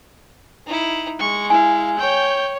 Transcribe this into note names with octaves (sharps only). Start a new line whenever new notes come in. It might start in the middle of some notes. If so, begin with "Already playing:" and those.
D#4 E4
G#3 C#6
E4 F5 G#5
C#5 G5 G6